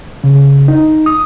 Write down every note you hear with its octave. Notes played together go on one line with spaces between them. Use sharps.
C#3
D#4
D#6